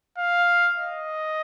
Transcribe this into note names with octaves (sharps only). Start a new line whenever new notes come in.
F5
D#5